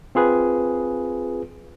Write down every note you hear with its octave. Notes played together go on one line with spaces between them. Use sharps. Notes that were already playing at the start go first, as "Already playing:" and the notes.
C4 F4 G#4 B4